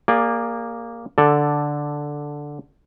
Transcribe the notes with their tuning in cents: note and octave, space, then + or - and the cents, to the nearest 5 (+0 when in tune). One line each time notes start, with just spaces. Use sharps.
A#3 +0 G#4 -30 D5 +0
D3 +0 A4 +0 D5 +0